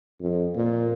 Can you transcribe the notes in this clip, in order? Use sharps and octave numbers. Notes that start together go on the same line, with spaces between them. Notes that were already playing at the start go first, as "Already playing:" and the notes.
F2
A#2